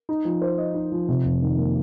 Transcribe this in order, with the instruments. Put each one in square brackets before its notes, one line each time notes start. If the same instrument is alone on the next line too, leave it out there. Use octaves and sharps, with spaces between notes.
[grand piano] D#4
F3
C5
D#5
D#4
F3
C3
F2
D#3
A#3